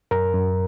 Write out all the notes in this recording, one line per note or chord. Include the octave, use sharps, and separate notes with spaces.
F#2 A#4 A#5
F#2